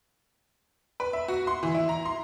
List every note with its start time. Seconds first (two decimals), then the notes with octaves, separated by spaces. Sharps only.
1.00 B4
1.13 E5
1.28 F#4
1.47 C6
1.63 E3
1.74 E4
1.89 A#5
2.05 C6